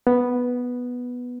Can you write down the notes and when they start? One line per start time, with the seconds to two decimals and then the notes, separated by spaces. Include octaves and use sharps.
0.07 B3